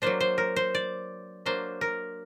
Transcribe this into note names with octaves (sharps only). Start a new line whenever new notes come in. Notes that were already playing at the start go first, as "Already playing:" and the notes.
F#3 A#3 D4 C5
C5
A#4
C5
D5
F#3 A#3 D4 C5
A#4